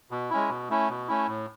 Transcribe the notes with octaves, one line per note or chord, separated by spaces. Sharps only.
B2
G#3 C#4 E4
B2
A3 C#4 E4
B2
A3 C#4 E4
A2